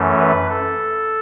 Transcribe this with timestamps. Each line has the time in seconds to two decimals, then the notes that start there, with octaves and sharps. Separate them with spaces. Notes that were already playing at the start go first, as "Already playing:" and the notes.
Already playing: F#2 E3 A3 C#4
0.20 B4
0.50 A4